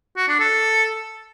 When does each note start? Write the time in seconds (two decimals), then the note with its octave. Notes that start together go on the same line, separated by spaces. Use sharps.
0.17 F#4
0.28 D4
0.40 A4